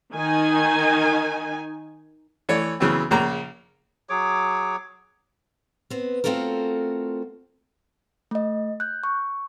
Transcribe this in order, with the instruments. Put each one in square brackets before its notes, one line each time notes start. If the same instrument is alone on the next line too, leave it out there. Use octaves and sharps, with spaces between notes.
[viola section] D#3 D#4 G#5
[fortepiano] E3 A3 C#5 D5
C#3 E3 F#3 B3 C4
A#1 C#3 A#3 A#5
[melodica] F#3 G#4 C#5 D6
[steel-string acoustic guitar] B3 C4
A3 C4 F4 F#4 A4 A#4
[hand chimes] A3 D#5
F#6 G6
C#6